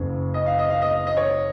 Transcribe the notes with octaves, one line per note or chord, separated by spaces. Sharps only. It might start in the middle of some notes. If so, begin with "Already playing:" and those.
Already playing: F#1 F#2 C#3
D#5
F5
D#5
F5
D#5
D#5
C#5